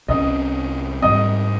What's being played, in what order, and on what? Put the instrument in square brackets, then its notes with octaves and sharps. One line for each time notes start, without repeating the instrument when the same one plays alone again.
[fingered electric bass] C2 C3 G3 C#4 [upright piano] D#5 D#6
[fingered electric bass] G#2 G3 C4 [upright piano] D#5 D#6